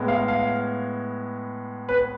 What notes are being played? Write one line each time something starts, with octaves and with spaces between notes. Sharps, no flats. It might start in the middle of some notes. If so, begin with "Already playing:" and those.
Already playing: A2 G#3 B3
F5
F5
B4